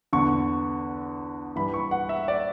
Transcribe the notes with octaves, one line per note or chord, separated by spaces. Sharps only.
E2 D3 C#6
G2 E3 B5
C#6
F#5
E5
D5